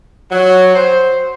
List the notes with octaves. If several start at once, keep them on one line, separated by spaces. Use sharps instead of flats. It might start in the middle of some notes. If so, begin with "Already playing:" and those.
F#3
C5